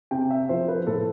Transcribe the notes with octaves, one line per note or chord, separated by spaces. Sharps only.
C3 G5
E5
F3 C5
B4
A2 A4